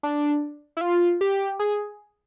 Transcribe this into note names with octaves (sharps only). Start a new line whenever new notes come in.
D4
E4
F4
G4
G#4